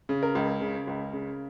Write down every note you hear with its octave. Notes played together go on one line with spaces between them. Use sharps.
C#3
A#4
C#2
C#3
C#2
C#3